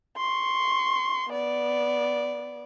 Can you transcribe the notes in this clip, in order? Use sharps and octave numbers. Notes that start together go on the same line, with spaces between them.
C6 C#6
B3 D5